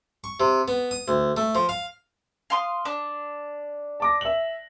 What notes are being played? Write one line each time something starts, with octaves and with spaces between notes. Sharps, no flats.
C#6
C3
B3
D#6
D2
A3
F3
F5
F5 C6 D#6
D4
A5 D6 A#6
E5 F#7